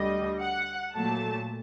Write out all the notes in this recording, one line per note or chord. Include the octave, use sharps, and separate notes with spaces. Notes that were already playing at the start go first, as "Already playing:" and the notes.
Already playing: D2 D3 G3 D#5
F#5
A#2 F#3 A3 A5